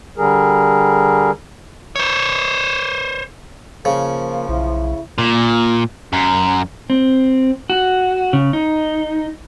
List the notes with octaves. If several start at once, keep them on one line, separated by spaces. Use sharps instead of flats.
D3 G3 G#4 A#4
C5 C#5
C#3 F3 A#3
B1 E4
A#2
F#2
C4
F#4
C#3
D#4